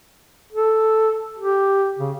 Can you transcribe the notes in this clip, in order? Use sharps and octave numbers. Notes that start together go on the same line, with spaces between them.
A4
G4
C#3